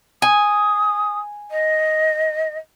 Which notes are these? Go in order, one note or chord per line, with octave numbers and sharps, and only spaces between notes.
G#5 D#6
D#5